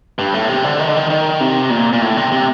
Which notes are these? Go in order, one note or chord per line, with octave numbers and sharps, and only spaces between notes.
G2
A2
C3
D3
D#3
D3
D#3
D#3
C3
A#2
A#2
A2
C3
C3